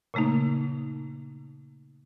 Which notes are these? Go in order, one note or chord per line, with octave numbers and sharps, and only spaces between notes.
A#2 C#3 A3 A#3 D#4